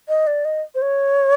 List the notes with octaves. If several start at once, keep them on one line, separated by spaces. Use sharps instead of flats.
D#5
D5
D#5
C5
C#5